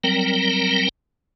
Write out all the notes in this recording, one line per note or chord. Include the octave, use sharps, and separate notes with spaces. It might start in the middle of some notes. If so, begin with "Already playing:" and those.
F#3 G3 C4 A#4 G5 A#5